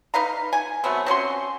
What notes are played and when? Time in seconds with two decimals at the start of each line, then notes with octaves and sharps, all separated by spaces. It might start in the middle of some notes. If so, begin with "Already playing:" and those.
0.14 D#4 B4 F5 A#5
0.53 G#5
0.84 F#3 A3 B3 C4
1.06 C4 C#4 F#4 C6